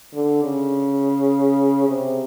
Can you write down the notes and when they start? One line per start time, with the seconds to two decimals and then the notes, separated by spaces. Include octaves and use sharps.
0.14 D3
0.43 C#3
1.88 C3